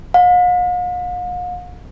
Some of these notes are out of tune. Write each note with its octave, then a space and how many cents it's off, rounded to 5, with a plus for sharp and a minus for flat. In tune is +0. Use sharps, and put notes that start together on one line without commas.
F5 +45